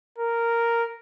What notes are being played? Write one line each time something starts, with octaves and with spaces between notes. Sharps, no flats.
A#4